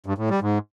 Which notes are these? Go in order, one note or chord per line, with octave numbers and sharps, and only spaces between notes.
G2
A2
G3
G#2